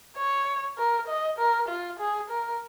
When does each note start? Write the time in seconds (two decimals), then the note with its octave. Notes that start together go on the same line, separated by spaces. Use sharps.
0.17 C#5
0.78 A#4
1.08 D#5
1.39 A#4
1.69 F4
1.99 G#4
2.30 A#4